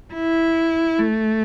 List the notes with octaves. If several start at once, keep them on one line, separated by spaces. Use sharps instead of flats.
E4
A3